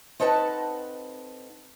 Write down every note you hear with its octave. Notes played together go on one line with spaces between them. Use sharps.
C4 D#4 A4 B4 F#5 A5